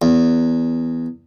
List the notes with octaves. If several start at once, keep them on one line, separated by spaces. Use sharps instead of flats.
E2